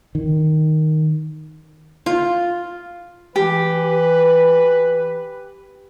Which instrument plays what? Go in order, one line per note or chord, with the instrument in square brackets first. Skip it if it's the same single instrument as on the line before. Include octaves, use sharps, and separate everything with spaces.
[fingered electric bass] D#3
[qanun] F4
[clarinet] E3 [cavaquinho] G4 [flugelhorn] B4